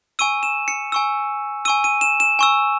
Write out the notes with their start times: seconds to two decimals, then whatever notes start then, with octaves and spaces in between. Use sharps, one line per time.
0.19 G#5 C#6 E6 D#7
0.43 E7
0.68 C#7
0.92 G#5 C#6 E6
1.65 G#5 C#6 E6 D#7
1.84 D#7
2.01 E7
2.20 E7
2.39 G#5 C#6 E6